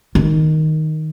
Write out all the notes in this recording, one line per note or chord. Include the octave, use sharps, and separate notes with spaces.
D#3